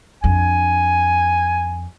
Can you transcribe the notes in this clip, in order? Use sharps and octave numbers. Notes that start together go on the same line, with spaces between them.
F2 D4 G#5